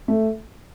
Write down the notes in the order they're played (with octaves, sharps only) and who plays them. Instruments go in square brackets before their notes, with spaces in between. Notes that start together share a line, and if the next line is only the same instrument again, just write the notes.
[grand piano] A3